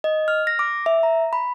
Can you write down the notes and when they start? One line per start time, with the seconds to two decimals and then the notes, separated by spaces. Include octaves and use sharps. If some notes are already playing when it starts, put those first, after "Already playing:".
0.04 D#5
0.28 F6
0.47 A#6
0.59 D6
0.86 E5
1.03 A#5
1.33 B5